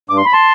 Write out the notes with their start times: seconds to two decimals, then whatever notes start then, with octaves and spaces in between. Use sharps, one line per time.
0.09 G2 D6
0.18 C6
0.25 B5
0.33 A5 C6